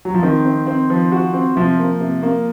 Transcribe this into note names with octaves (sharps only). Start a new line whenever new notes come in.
F#3
F3
D#3 C4
C4
C4
F3
F#4
C4
C3 F3
A#3
C3
A#3